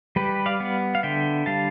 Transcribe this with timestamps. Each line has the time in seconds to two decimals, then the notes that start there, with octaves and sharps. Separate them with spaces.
0.16 G3 G4 B4
0.46 D5 F5
0.60 B3
0.95 F5
1.03 D3 E5 G5
1.46 G3 F5 A5